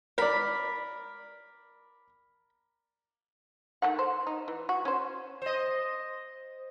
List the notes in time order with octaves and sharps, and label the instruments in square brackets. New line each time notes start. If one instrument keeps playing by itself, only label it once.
[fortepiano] A#4 D5 [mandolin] B5
[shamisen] D#3 A3 F#5
C5
D#4
E3
F#4
C#4 C5
[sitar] C5 D#5